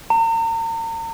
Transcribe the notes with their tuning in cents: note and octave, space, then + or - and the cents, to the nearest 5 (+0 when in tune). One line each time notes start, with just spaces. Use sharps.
A#5 -40